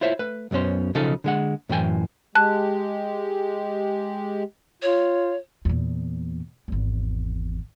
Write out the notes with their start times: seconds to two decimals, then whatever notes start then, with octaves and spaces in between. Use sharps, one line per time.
0.01 E4 F4 C5 C#5 E5
0.19 A3 B4
0.51 B1 F#2 B2 C#4 C5
0.95 B1 C#3 F3 D#4 A4
1.24 D3 G#3 F#5
1.69 F#2 A2 E3 G5 G#5
2.35 G#3 G4 A5 F#6
4.82 F4 C#5
5.65 E2 A#2
6.68 G#1 E2